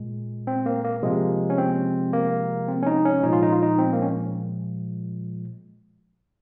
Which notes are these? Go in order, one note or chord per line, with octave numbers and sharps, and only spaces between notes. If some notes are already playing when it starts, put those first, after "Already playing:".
Already playing: A#2 G#3
C4
A#3
A#3
C3 F3 G#3 A#3
C#4
C4
A#3
C4
C#4
D#4
C#4
A#2 F3 G#3 D#4
F4
D#4
F4
D#4
C4
A#3
C#4